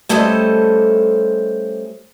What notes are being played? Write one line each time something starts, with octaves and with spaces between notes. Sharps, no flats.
G3 A3 C#4 A4 C5 D#5